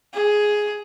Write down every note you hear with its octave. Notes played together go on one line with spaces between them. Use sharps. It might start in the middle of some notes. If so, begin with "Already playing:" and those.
G#4